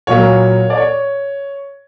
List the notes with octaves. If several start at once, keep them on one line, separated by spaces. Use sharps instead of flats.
A#2 F#3 A#3 C#5
D5
C#5